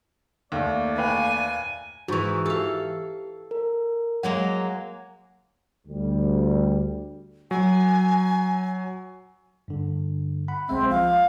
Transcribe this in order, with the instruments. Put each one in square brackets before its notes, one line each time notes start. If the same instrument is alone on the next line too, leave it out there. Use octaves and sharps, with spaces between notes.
[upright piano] D#2 [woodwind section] A3 A#3 D5
[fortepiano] B4 F5 G5 [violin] G#5
[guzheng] G#2 E3 [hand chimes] F#4 C#6
[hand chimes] G4 [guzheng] A4 F5
[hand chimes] A#4
[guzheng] F#3 G#3 A#3 [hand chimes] F#5
[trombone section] D2 G3
[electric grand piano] F#3 [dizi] G#5
[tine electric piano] G2 D3
F#5 B5
[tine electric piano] B1 G#3 E5 [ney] C4
[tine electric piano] F3 [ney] F5